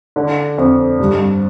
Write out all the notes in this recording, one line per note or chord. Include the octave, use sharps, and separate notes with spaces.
D3
F2
G2